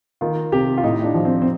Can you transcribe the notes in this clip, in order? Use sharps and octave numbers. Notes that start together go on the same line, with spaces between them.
D#3 F4
C3 G4
F4
A2 D#4
D4
F3
C4
C4